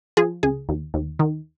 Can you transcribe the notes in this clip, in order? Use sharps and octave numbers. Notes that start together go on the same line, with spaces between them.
F3 G#4
C#2 G#4
D#2
D#2
D#3